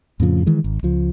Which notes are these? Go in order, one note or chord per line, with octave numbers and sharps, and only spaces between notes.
F2 A2 C#3 F3
D#3 E3 G#3
G#1
C#2 F3